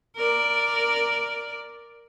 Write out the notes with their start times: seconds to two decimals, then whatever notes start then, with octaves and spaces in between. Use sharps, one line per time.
0.16 A#4 D5